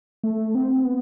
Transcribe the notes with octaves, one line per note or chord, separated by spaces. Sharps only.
A3
C4
B3